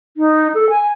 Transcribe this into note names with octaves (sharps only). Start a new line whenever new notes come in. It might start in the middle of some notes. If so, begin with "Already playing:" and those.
D#4
A4
G#5